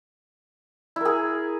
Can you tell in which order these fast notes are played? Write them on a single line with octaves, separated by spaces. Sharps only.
E4 A#4 G#4